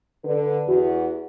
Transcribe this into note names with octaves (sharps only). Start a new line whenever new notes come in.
D3 B4
E2 F#4